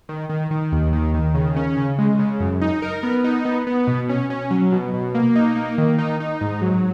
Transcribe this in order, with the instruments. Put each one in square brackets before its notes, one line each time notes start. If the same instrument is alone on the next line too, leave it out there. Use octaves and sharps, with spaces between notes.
[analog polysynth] D#3
D#3
D#3
D#2
D#3
D#3
C#3
C#4
C#3
G#3
C#3
F#2
D#4
A#4
B3
D#4
B3
B3
B2
C#4
C#4
F#3
B2
B2
A#3
D#4
A#3
D#3
D#4
D#4
G#2
F#3